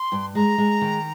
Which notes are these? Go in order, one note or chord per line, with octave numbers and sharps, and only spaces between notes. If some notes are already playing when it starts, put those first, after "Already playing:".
Already playing: C6
G2
G#3 A#5
G#3
D#3